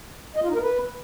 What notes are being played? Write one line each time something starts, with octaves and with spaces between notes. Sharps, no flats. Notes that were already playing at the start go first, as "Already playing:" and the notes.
D#5
F4
D#4
A#4
B4